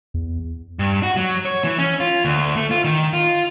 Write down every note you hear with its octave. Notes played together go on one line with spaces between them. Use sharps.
E2
G2
F#4
F#3
C#5
E3
C#4
F4
D2
A3
F4
D#3
F4